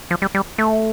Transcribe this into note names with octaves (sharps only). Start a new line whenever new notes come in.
F3
G3
G3
A3